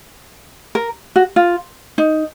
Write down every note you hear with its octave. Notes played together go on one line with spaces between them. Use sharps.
A#4
F#4
F4
D#4